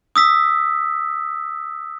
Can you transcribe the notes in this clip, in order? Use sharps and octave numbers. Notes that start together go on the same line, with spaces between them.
D#6 E6 B6